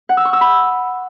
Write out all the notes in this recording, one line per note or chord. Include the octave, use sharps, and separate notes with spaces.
F#5
E6
C#6
E6
B5